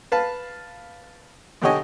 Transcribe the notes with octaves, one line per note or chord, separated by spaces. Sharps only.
B4 F5 A5
B1 D3 G4 C#5 D#5 G#5